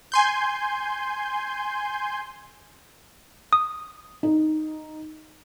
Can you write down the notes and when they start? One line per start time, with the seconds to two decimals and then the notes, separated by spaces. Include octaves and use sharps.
0.12 G#5 C6 G6
3.53 D#6
4.23 D#4